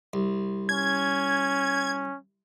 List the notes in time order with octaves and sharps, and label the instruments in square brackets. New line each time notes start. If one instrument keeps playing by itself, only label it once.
[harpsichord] C2
[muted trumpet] C#4 [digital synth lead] G#6